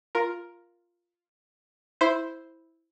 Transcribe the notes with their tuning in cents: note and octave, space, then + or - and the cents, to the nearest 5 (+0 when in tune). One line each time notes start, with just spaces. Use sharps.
F4 +0 A#4 +5
E4 -5 C5 +0 E5 +0